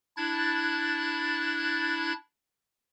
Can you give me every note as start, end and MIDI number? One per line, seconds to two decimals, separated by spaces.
0.17 2.13 62
0.17 2.13 64
0.17 2.13 90
0.17 2.13 92
0.17 2.13 93